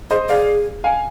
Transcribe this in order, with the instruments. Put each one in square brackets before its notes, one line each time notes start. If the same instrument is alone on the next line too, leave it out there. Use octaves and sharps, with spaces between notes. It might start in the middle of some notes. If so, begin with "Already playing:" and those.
[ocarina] G#4 [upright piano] C5 D#5
[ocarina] G#4 [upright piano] D5 F5
[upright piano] F5 G#5